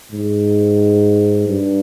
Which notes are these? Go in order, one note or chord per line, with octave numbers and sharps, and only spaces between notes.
G#2
G2